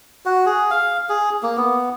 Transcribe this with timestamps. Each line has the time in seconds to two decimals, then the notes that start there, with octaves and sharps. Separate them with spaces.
0.26 F#4
0.46 G#4
0.71 F5
1.09 G#4
1.43 A#3
1.57 B3